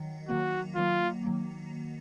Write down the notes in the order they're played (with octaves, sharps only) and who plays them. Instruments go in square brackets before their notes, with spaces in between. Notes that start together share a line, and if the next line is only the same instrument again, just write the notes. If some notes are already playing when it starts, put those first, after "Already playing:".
Already playing: [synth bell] D#3 F#3
[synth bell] D#3 F#3 A#3 [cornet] F#4
[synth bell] D#3 F#3 A#3 [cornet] F4
[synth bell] D#3 F#3 A#3